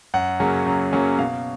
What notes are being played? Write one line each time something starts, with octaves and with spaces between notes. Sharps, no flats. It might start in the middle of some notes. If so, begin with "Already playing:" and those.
F#2 F#5
C#3 F#3 A#3 C#4
F#2
C#3 F#3 A#3 C#4
B2 F5